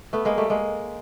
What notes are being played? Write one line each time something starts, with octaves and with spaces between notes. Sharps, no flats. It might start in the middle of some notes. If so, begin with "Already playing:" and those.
A3 B3
G#3 A#3
G3 A3
G#3 A#3